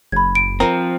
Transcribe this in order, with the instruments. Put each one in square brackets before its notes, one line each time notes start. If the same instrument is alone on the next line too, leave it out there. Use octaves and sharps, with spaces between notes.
[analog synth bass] F#1 [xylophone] B5 G#6
[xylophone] D7
[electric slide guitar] F3 C4 [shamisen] A#4